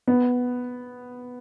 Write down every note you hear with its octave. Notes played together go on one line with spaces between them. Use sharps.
B3